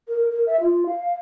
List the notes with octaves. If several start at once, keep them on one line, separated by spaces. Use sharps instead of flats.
A#4
A#4
E5
F4
F5